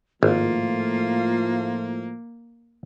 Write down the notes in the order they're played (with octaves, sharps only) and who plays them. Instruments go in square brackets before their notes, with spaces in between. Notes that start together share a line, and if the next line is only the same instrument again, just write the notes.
[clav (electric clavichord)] G#1 [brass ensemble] A2 F3 A3 [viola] A#3 [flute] F4